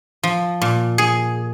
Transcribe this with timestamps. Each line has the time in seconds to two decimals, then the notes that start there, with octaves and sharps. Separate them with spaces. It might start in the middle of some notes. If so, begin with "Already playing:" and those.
0.23 F3
0.62 A#2
0.98 G#4